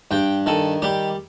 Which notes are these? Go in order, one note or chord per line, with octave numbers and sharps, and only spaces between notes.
G2 G5
D#3 A4
G3 G4